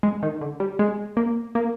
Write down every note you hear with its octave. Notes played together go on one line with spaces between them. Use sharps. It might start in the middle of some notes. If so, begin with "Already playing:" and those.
G#3
D#3
D3
G3
G#3
A#3
A#3